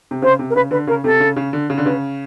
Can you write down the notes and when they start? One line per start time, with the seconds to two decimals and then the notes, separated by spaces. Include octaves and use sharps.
0.11 C3
0.22 C#3 C5
0.39 C3
0.50 A#4
0.55 C#3 B4
0.71 D3 B4
0.87 C#3 A#4
1.04 C3 A4
1.20 C#3
1.36 C#3
1.53 D3
1.70 C#3
1.78 D3
1.85 C#3 B4